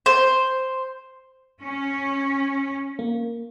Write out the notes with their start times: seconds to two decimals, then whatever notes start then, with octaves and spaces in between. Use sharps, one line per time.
0.06 C5
1.63 C#4
2.99 A#3